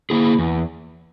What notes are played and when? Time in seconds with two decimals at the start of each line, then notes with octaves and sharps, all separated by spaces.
0.10 A#3 E4 G#4
0.39 E2